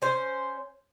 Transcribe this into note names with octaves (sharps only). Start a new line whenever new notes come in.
C#4 C5